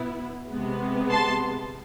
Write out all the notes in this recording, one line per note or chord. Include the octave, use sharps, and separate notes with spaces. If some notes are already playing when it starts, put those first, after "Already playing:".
Already playing: B2 B3 E4
C3 G#3 B3
A5 C6